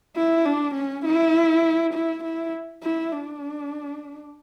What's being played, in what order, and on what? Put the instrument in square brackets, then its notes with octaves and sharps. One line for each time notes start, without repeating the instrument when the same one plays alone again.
[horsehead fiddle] E4
D4
C#4
E4
E4
E4
E4
D4